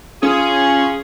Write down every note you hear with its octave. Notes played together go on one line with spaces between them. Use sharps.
C#4 F4 G#4